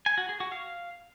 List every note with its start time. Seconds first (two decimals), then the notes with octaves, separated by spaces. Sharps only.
0.06 G#5
0.18 F#4
0.29 G#4
0.40 F#4
0.52 F5